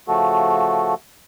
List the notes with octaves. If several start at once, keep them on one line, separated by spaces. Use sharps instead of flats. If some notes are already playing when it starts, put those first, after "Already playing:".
C#3 F3 A3 F#4 A4